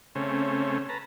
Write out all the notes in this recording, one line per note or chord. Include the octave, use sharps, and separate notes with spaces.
C#3 A3 C4 C#4
B4 A5 A#5